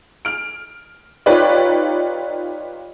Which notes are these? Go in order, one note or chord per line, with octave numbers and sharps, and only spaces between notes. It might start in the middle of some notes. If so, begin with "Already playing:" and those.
F6 D7
D#4 F4 G4 B4 C#5 D5